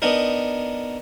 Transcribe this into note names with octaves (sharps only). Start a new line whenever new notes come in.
B3 D4 D#4 A#4